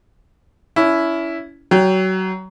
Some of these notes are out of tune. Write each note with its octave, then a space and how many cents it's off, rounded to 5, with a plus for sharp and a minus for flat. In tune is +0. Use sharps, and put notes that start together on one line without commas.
C#4 +35 E4 +5
F#3 +25 G5 +0